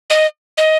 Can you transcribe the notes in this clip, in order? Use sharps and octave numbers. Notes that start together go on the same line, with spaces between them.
D#5
D#5